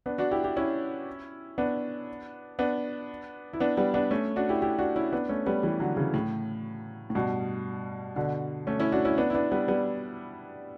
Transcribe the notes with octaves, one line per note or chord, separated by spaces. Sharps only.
B3 D4
D4 F#4
E4 G4
E4 G4
C#4 E4
B3 D4
B3 D4
E4
B3 D4
G3 B3
B3 D4
A3 C#4
D4 F#4
E4 G4
E4 G4
D4 F#4
C#4 E4
B3 D4
A3 C#4
G3 B3
E3 G3
D3 F#3
C#3 E3
A2
A2
G2 B2
B2 D3
A3 C#4
C#4 E4
D4 F#4
C#4 E4
B3 D4
E4
B3 D4
G3 B3
G3 B3